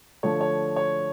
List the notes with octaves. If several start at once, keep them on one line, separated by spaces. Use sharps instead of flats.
D3 F3 A3 C#5
C#5
C#5